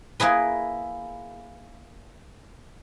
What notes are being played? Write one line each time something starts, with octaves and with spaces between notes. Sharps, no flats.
A#3 E4 G#4 B4